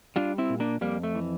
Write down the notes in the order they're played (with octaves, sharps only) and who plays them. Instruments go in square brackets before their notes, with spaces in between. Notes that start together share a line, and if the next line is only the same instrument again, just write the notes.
[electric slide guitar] G3 D4 F4
C4 E4
A#2
A#3 D4
F2 G3 A#3
A3
E3